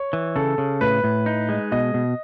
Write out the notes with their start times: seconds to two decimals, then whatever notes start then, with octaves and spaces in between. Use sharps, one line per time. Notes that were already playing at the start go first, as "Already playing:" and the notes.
Already playing: C#5
0.13 E3
0.36 C#3 A4
0.58 C#3
0.81 A2 B4
1.04 A2
1.26 D#4
1.49 G#3
1.72 B2 D#5
1.94 B2